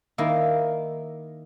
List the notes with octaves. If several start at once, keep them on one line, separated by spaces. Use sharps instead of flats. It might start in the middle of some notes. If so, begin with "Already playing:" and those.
D#3 A#3 E4